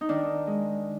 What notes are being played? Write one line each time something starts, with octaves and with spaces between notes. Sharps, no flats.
D#4
D#3 D4
G#3